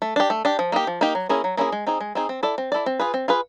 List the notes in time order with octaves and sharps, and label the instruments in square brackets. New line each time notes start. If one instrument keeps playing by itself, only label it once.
[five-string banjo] A3
D4 G4
A3
D4 G4
F3
A#3 D#4 G4
F3
A#3 D#4 G4
F#3
A#3 C#4 E4 G#4
F#3
A#3 C#4 E4 G#4
G#3
C4 D#4 G#4
G#3
C4 D#4 G#4
C4
E4 A4 D5
C4
E4 A4 D5
C4
F4 G#4 B4
C4
F4 G#4 B4